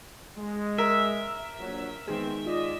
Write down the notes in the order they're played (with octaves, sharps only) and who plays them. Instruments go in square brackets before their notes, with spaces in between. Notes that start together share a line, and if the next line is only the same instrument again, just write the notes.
[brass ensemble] G#3
[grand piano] A#4 [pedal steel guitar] E5
[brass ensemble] A#1 F#3
[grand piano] D#3 G#3 [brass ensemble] B3 C4
[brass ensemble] F4 D5 D#5